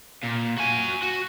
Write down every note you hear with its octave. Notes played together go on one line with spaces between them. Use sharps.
A#2
F#4 G#5
F#4